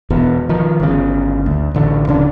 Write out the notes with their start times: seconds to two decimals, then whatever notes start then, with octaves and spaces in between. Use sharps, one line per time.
0.10 E1 E2 B2
0.49 D#3 F3
0.80 G1 C#3
1.46 D2
1.75 A1 D3
2.07 D1 C#3 D4